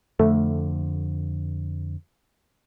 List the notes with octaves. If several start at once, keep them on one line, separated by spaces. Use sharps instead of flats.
F2 D3 A3